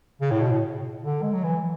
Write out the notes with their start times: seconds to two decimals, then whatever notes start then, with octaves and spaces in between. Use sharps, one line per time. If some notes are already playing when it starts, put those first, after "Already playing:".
0.21 C#3
0.31 A2
0.42 B2
0.51 A2
1.03 D3
1.22 G#3
1.33 F#3
1.44 E3